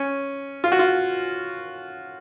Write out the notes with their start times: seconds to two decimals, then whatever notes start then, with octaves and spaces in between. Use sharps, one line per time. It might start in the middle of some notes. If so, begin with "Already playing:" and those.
Already playing: C#4
0.64 F4
0.72 F#4
0.79 F4